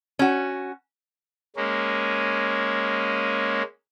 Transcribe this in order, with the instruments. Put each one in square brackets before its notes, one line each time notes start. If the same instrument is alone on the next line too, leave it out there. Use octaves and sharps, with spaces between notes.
[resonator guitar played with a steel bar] C#4 F#4
[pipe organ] G#3 A#3 C#4